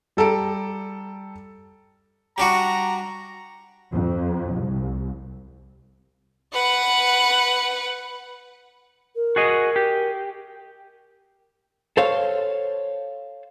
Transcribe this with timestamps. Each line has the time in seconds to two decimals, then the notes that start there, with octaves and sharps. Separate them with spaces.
0.17 G3 A4 A#5 D7
2.38 G3 D4 F#4 A#5
3.91 F2
4.53 C2
6.54 B4 F#5
9.15 A#4
9.36 F#4 G#4 D#5
9.76 G4
11.97 A4 C5 C#5 F5